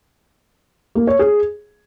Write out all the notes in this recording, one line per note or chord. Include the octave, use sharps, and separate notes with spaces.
A#3
C#5
G#4